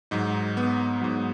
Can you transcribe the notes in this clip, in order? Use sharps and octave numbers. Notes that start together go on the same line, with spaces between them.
G#2 F#3 D#4
B3
G#2 F#3